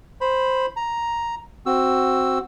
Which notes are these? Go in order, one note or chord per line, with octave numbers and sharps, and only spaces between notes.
C5 B5
A#5
C4 F#4 E6